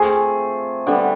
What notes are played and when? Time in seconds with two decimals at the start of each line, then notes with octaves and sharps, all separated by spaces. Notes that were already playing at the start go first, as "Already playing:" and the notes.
Already playing: A3 C4 F4 G#4
0.87 D3 G3 B3